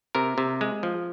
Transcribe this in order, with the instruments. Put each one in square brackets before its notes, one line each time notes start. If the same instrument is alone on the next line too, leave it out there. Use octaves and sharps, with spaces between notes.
[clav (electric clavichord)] C3 A#4
C3
G#3
F3